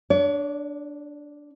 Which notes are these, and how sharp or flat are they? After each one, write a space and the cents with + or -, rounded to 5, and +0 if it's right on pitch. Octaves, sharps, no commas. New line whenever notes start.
D4 +0 C#5 +40